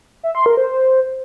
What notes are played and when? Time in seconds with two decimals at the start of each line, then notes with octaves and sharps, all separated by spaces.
0.23 E5
0.35 C6
0.46 A#4
0.57 C5